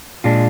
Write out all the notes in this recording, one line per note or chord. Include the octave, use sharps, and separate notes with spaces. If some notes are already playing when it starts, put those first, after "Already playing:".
A#2 G#3 D4 F4